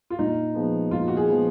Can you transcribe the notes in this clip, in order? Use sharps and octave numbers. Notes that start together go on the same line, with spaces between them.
F4
A#2 D#4
F3 G#3 B3
A#2 F4
F#4
G#4
F3 G#3 B3